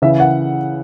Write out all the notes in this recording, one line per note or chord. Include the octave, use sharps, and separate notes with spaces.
C#3 E3 E5
F#5